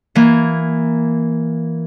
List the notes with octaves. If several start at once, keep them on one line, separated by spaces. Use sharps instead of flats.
E3 A#3